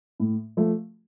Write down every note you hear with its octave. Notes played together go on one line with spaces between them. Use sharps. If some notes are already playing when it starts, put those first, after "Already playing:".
A2
F3 A3